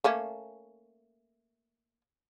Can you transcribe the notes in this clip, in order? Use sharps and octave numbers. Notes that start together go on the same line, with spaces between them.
A3 A#3 C#4